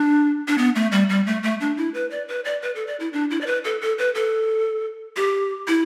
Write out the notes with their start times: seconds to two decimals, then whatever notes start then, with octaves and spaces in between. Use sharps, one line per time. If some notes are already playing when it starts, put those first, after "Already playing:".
Already playing: D4
0.48 D4
0.58 B3
0.75 A3
0.92 G3
1.09 G3
1.26 A3
1.43 A3
1.60 D4
1.77 E4
1.94 B4
2.11 D5
2.28 B4
2.45 D5
2.62 B4
2.75 A4
2.87 D5
3.00 E4
3.13 D4
3.30 E4
3.41 D5
3.46 B4
3.64 A4
3.81 A4
3.98 B4
4.15 A4
5.16 G4
5.68 E4